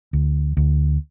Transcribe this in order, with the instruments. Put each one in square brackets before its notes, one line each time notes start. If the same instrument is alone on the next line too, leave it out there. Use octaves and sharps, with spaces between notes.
[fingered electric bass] D2
D2